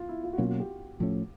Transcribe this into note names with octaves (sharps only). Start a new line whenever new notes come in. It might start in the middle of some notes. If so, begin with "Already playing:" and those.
Already playing: F4
E4
F4
F#4
B2 F#3 A#3 C#4 F4
F#4
G4
A2 F3 A3 C#4